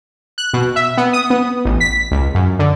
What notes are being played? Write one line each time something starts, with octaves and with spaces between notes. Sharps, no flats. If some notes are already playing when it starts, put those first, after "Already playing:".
F#6
B2
E5
B3
D#6
B3
A1
B6
C#2
F#2
D3